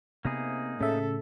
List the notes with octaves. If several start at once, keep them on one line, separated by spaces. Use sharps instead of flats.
C3 A#3 B3 D#4 G#4
A2 C#3 A4 E5